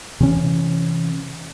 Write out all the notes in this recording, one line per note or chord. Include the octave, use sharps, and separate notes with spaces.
C3 E3 C#4